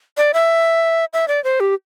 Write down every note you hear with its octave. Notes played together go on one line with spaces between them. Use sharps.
D5
E5
E5
D5
C5
G4